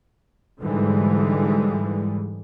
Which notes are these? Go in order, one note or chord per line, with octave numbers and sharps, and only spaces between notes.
G#2 D3 E3 G3 G#3